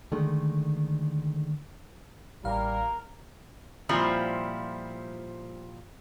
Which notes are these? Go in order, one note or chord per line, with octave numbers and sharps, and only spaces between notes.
D3 D#3 G#3 A3
A1 G3 A#3 A#4 F5
A#2 F3 G3 C4 E4